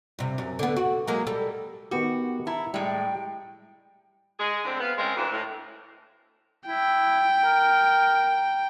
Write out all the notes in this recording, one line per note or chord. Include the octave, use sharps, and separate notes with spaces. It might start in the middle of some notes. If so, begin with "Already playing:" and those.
G2 C3
F#2
D3 B3
F#4
F#3 G#3 A#3
G3 A4
D#3 B3 F#4 G4
E4 A5 A#5
A2 G3 G#3 G5
G#3 G#4
A2 D3 C4
B3 F5
C#3 G#3 C4 A#4
D2 E3
A2
E4 G5
A#4